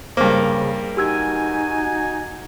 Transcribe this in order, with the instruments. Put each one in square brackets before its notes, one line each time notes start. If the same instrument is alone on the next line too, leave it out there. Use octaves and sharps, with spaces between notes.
[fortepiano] G2 A#3 [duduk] C#3 [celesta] C5
[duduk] D#4 [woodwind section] F#4 G#5 [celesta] G4 E6 G#6